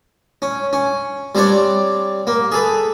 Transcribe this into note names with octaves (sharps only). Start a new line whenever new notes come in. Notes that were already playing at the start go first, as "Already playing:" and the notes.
C#4
C#4
G3 C4 D4 C#5 D5
A#3
G#4 A4 B4